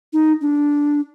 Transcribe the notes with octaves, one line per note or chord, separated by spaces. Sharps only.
D#4
D4